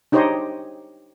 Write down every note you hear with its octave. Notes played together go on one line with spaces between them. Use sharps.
D4 D#4 G4 C5 C#5 D#5